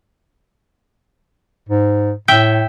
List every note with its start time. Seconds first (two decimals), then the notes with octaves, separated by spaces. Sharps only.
1.69 G#2
2.28 A2 E5 G5